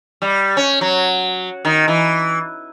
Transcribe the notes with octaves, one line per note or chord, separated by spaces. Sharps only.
G3
C#4
F#3
D#3
E3